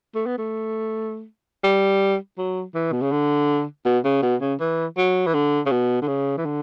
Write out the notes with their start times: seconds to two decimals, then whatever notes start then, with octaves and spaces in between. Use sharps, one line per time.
0.15 A3
0.26 B3
0.38 A3
1.64 G3
2.38 F#3
2.75 E3
2.92 B2
3.01 C#3
3.12 D3
3.85 B2
4.04 C#3
4.22 B2
4.41 C#3
4.60 E3
4.97 F#3
5.27 E3
5.34 D3
5.66 C#3
5.71 B2
6.02 D3
6.08 C#3
6.37 E3
6.45 D3